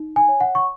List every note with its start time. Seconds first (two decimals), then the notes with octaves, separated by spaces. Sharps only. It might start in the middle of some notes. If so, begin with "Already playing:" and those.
Already playing: D#4
0.16 G#5
0.28 C#5
0.40 F#5
0.55 C#6